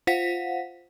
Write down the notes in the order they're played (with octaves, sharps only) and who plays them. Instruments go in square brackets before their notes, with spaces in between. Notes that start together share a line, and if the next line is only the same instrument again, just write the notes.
[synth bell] F4 C5 F5 F#5 B6